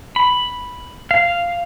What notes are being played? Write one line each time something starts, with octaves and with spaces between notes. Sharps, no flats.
B5
F5